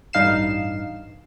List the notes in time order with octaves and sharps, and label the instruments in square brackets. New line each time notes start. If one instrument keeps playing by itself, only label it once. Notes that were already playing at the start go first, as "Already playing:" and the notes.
[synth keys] A1 G2 D#4 F5 C7 E7